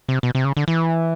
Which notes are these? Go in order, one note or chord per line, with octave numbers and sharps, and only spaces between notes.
C3
B2
C3
C#3
D3
E3